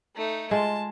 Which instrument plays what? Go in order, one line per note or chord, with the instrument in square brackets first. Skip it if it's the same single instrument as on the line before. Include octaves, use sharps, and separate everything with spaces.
[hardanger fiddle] A3 D#4
[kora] G#3 F4 [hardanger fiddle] A5